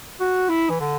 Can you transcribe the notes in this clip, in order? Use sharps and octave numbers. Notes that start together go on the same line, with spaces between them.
F#4
E4
E3
D3